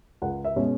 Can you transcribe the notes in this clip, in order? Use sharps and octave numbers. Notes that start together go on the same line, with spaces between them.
C#2 F#5
E5
B2 G#3 C#4